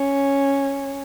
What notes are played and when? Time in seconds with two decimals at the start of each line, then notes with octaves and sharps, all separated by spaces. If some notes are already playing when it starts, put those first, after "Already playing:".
Already playing: C#4